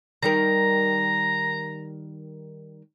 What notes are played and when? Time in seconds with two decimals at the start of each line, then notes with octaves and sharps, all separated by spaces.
0.23 D#3 G3 A#4 A#5